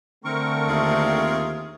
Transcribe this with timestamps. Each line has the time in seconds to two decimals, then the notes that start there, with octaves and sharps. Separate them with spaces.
0.25 D3 A3 C4 A#4 C#6
0.68 D#2 F4 G#4 E5